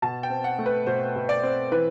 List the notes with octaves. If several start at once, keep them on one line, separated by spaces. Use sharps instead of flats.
B2 A5
G5
C4
F#5
A3
B4
B2 C5
B2
D5
C4
E3 B4